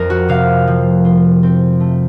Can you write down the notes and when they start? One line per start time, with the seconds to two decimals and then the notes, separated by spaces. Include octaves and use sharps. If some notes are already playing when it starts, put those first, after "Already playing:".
Already playing: F2 A#4
0.10 F#4
0.29 C3 F5
0.67 F3
1.05 F4
1.43 C4
1.80 A3